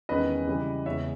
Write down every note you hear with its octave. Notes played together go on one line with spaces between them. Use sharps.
E2 D#3 G#3 C#4 B4 D#5
C#3 E3 G3
E2 C#3 G#3 C#5 E5